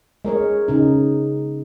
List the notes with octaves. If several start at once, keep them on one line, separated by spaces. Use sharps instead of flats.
G#3 A#4 C#5
C#3 D#4